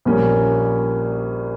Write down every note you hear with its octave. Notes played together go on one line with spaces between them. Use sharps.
A#1 A#2 G3 A#3 C#4